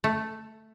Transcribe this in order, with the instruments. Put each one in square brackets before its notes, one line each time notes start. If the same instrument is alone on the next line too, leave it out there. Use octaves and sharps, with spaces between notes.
[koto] A3